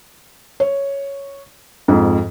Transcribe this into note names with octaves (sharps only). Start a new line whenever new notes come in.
C#5
F2 G#2 F3